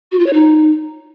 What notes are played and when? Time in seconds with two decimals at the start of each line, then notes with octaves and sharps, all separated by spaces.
0.12 F#4
0.19 F4
0.26 C#5
0.33 D#4